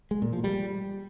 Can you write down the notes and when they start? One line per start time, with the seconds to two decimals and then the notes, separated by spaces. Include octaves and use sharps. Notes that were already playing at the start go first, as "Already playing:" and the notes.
0.11 G#3
0.22 A#2
0.33 F3
0.44 G3